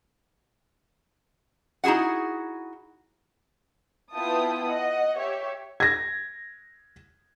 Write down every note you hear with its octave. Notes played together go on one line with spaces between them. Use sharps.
D#4 E4 F#4 G#4 F#5
B3 E4 F4 G5 A5 D#6
D#5 F#5
G4 C#5 E5
G#6 A#6